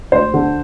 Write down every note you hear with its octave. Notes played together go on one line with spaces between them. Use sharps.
D2 C5
D3